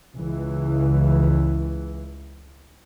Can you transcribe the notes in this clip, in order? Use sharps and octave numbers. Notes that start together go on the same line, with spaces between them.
C#2 E3